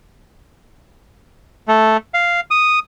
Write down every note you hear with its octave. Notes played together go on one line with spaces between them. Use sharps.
A3
F5
D#6